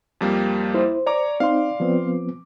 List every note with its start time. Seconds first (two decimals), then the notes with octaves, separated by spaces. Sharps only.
0.21 F2 G3 A#3
0.74 E4 C5
1.06 C#5 D5 A#5 D6
1.40 C4 D#4 F5 C6
1.80 F3 B3 C4